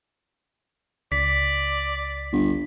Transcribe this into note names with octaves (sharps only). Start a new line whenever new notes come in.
C#2 D5 B6
G1